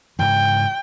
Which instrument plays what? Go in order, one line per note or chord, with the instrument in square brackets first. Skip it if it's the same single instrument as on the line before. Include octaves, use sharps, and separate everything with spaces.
[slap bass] G#2 C#3 E3 [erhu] G5